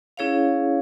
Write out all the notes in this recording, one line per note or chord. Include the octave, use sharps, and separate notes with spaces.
C#4 E4 G#4 C#5 F5